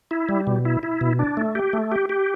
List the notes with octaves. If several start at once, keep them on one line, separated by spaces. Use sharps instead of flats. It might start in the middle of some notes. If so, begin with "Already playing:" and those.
E4
G3
B2
E4
E4
B2
D4
A3
G4
A3
G4
G4